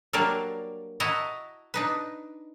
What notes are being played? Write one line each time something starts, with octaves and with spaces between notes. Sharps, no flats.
F#3 G3 A#3 D4 D5 F5
E4 F#4 D#5 A5 A#5
D4 D#4 B4